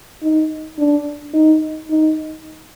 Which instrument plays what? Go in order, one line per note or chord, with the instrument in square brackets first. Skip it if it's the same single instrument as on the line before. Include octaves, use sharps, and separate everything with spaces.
[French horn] D#4
D4
D#4
D#4